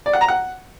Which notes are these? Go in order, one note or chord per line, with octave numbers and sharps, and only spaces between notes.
D5
F#5
A#5
F#5